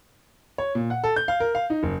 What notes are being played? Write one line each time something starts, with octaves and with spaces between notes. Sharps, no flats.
C#5
A#2
F#5
A4
G6
F5
A#4
F5
D#4
F#1